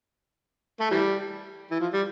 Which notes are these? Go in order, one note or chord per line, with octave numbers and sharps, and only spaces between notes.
A3
E3 G3
E3
F3
G3